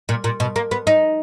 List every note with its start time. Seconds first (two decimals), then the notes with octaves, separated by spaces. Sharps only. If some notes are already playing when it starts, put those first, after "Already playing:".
0.09 A#2
0.24 A#2
0.40 B2
0.56 A#3
0.71 B3
0.87 D#4